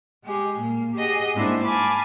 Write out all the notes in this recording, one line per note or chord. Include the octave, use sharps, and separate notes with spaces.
G#3 G4 G#4
A#2 A#3
G4 G#4 D#5 F#5
G#2 G#3 A#3 C4 D4 E4
F5 G#5 A5 B5 D6